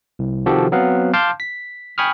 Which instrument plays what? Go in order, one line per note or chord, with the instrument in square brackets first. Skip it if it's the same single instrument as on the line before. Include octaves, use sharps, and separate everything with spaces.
[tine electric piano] C2
C3 D#3 F3 F#4 G4 A4
F#3 B3 C4 F5 F#5
F5 A5 C6 D6 F6 G6
B6
G5 G#5 B5 C#6 D#6 F6